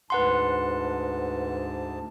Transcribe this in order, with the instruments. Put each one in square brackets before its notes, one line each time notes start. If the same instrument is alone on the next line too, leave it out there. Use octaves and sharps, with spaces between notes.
[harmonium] D2 G#2 A5 [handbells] B4 F#5 C6